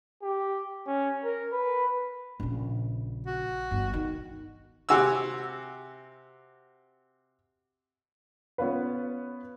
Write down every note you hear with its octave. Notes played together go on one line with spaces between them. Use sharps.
G4
C#4
A#4
B4
A#1 C#3
F#4
G1 G2
D#3
C3 F#4 G#5 E6
B3 C#4 F4 B4